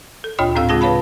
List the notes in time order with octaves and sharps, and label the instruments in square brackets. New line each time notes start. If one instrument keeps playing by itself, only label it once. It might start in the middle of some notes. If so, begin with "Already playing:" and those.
[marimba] A4
D2 A#2 D4 F4 C#5 G5
A2 C4 A4 F5 E6
C#3 G#3 F4 G#4 A5 A#6
B4 C#5 F5 A5 B5